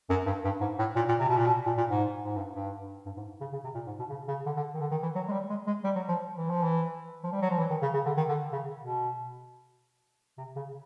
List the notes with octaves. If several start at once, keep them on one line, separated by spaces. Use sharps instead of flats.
F#2
G2
G2
G#2
A2
A#2
A#2
C3
B2
A#2
B2
A#2
A#2
G#2
G#2
G2
G2
G2
G#2
C#3
C#3
C3
A#2
G#2
B2
C#3
C#3
D3
D3
D#3
D3
D#3
E3
F#3
G#3
G3
G#3
G#3
G3
F#3
F3
E3
F3
E3
F3
G3
F#3
F3
E3
D#3
C#3
C#3
D3
D#3
D3
C#3
B2
C3
C#3